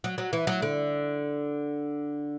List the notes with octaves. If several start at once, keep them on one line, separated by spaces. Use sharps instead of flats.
F#3
F#3
E3
F#3
D3